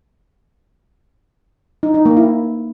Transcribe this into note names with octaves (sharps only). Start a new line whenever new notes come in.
D#4
D#4
A#3
E4